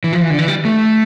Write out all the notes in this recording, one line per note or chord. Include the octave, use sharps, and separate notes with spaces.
E3
F3
E3
D3
E3
G3
A3